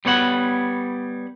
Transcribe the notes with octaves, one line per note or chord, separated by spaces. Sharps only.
G3 B3 C#5 F#5